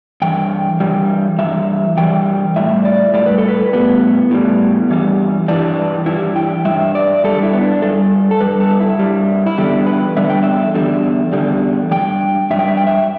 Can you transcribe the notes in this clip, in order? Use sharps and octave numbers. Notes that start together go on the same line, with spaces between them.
G2 E3 G5
G2 E3 G3
G2 E3 E5
G2 E3 G3 G5
A2 G3 E5
D5
A2 G3 D5
B4
A4
B4
A2 G3 B3
A2 G3
G2 E3 G3
G2 E3 G3 D4
G2 E3 G3 E4
G5
G2 E3 G3 E5
D5
G2 G3 A4
E4
B3
D4
G2 G3 A4
A4
G2 G3 B4
A4
E4
G2 G3
E4
E2 D3 G3 G4
B4
E2 D3 G3 E5
G5
E5
E2 D3 G3
E2 D3 G3
G2 G3 G5
G2 G3 E5
G5
E5
G5
E5